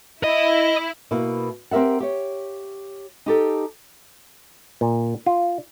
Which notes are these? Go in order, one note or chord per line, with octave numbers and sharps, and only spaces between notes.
E4 D#5
B2 A#3 E4
C4 G4 A#4 E5 F#5
G4 C#5
D#4 G4 A4
A#2
F4